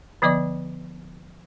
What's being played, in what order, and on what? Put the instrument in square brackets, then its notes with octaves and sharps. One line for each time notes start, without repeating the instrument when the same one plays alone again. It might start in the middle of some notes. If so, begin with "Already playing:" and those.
[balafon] D3 F3 B3 D5 D#5 D6